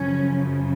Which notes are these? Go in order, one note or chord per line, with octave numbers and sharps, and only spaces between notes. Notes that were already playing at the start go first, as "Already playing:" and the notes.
Already playing: F#2 C#3 F3 C#4